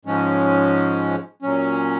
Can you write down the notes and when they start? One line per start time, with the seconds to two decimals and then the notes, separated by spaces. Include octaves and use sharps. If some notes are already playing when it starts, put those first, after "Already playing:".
0.05 G#2 F3 G#3 C#4
1.43 A#2 F#3 C#4